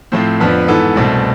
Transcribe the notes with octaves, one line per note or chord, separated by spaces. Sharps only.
A2 F3 A3 C4 C5
F2 D3 F3 B3 B4
G#2 E3 B3 A4
C2 B2 A3 C4